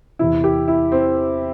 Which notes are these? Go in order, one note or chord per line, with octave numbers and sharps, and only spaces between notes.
E2 C3 E3 E4
G4
E4
C4